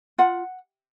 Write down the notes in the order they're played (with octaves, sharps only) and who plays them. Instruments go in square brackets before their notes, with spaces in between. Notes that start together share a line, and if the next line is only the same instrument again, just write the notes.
[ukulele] F4 F#5